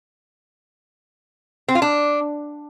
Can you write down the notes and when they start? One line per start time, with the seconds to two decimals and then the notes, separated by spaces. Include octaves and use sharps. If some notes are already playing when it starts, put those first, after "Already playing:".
1.68 C4
1.75 F4
1.82 D4